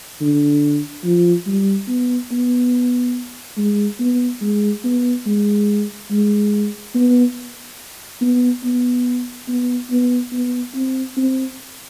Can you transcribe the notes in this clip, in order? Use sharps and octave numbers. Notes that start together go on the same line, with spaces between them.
D3
F3
G3
B3
B3
G#3
B3
G#3
B3
G#3
G#3
B3
B3
B3
B3
B3
B3
C4
C4